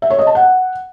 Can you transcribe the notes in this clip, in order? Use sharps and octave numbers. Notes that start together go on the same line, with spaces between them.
E5
C#5
D#5
A5
F#5